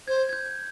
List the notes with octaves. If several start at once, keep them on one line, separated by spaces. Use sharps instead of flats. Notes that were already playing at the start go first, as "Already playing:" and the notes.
C5 G#6
G#6
G6